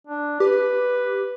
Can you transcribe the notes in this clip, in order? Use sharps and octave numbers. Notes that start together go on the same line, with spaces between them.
D4
G4 B4